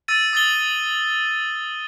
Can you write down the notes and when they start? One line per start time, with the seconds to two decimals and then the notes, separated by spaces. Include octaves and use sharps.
0.08 E6 A6 D#7
0.33 D#6 A6 G7